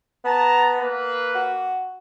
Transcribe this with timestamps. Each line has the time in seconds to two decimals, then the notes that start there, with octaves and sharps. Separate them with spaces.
0.24 B3 A5 A#5
0.79 A#3 B4
1.35 F#4